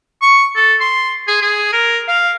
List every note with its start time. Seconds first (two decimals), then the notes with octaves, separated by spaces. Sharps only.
0.22 C#6
0.56 A4
0.80 C6
1.28 G#4
1.42 G#4
1.73 A#4
2.08 F5